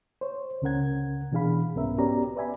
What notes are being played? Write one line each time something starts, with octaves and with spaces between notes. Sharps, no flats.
C5 C#5
C#2 C#3 C#4 A#4 F#5 G#6
B2 E3 D4 G#4 F5 B5
C2 G#2 B3 C#4 A#4 E5
B3 C#4 F#4 G4 D5 A#5
B4 D5 E5 G#5 B5